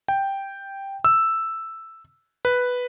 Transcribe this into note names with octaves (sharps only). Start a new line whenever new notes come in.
G5
E6
B4